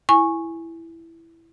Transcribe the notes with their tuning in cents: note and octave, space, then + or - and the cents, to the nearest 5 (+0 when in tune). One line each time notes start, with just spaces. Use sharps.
E4 +5 G#5 +0 C#6 -15